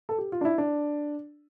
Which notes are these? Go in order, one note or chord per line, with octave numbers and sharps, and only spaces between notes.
A4
G4
F4
D4
E4
D4